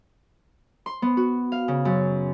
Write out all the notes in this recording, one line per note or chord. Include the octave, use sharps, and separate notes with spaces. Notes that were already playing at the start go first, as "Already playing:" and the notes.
C6
B3
F#4
F5
C#3
F#2